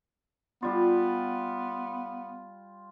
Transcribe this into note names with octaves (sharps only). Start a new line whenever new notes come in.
G3 B3 F4